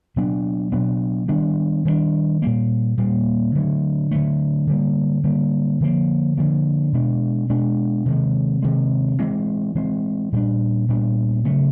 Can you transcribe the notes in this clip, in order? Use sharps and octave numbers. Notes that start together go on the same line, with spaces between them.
B2 F#3 B3 D4
B2 F#3 B3 D4
D#3 G3 B3 D4
D#3 G3 B3 D4
A#2 G3 A#3
A#2 G3 A#3
D3 F#3 A3
D3 F#3 A3
D3 G3 A#3
D3 G3 A#3
D3 F3 A#3
D3 F3 A#3
B2 G#3 B3 D4
B2 G#3 B3 D4
C3 D#3 G#3
C3 D#3 G#3
E3 G#3 C4
E3 G#3 C4
A#2 G3 B3 D4
A#2 G3 B3 D4
C#3 F#3 A3